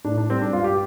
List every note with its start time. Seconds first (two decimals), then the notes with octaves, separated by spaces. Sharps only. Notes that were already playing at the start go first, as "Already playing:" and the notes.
0.05 A2 D4
0.18 D4
0.29 G3 C4
0.42 D4
0.53 G2 F4
0.64 G4